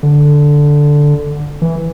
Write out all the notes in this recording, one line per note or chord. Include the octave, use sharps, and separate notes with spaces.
D3
E3